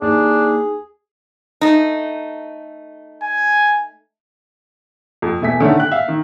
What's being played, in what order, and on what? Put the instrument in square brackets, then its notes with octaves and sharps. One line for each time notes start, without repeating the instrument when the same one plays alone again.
[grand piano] D#2 [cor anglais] D4 [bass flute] D#4 [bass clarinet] G#4
[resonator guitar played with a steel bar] A3 D#4
[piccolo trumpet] G#5
[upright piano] F2
E1 A3 E5 G#5 B6
A2 D3 D#3 A3 C#4
G5 F#6
E5 F5
D#3